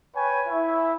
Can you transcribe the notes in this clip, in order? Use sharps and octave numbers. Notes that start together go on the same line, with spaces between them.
B4 C#5 G5 G#5
E4 E5